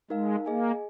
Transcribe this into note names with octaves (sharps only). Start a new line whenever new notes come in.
G#3 D#4 A#4 F5
A#3 G#4 D#5 G#5